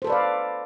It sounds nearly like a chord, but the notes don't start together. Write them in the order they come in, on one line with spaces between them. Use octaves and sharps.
C5 A4 B4 D5 F5